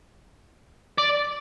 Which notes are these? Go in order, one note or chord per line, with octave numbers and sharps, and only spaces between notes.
D5